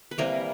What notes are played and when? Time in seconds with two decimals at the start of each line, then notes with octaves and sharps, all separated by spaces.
0.11 B4
0.18 C3 E3 G3 A#3 A#4